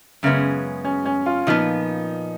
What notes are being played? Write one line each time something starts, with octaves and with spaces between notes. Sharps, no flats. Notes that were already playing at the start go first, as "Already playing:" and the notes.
F#2 C#3 G#3 B3
C#4
C#4
F4
A#2 F3 B3 D#4